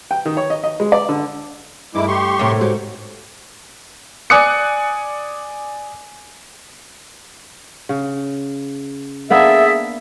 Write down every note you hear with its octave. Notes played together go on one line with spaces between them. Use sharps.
G5
D#3
C#5
D#5
D#5
G#3
D5
D3
G2 G#3 A3 E4 D6
G4 C6 C#6
A2 C3 A#4
G#2 F#4 G4 C#5
D5 G#5 D6 D#6 F#6 C#7
C#3
A#3 B3 D4 G#4 A4 E5